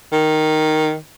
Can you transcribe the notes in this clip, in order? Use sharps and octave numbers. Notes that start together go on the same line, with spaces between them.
D#3